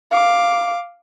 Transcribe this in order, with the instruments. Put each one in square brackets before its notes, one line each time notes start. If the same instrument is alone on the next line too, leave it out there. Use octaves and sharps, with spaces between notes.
[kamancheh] F5 D6